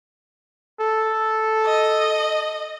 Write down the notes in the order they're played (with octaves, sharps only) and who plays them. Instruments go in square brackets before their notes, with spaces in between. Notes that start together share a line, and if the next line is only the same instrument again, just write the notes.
[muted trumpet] A4
[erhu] D#5